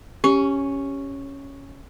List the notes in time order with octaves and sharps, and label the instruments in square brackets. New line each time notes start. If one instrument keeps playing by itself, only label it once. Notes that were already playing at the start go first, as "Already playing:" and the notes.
[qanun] C#4 [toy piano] G4